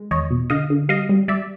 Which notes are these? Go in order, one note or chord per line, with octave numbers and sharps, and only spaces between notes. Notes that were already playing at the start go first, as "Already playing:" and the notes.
Already playing: G#3
E2 C#5 D#5
B2
D3 D#5 F5
D3
G3 D#5 F5
G3
G3 D5 E5